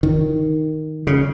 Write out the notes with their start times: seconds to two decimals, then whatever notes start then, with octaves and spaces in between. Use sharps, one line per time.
0.03 D#3
1.07 C#3